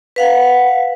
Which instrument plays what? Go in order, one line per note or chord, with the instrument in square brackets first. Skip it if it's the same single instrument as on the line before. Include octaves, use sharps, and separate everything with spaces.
[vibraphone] B4 F5 F#5